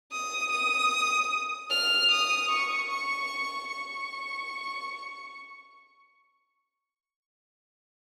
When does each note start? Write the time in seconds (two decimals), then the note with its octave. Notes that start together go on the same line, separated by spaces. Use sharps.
0.12 D#6
0.52 D#6
1.70 F6
2.11 D#6
2.51 C#6
2.91 C#6
3.69 C#6